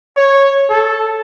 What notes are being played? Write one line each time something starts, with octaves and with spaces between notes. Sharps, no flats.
C#5
A4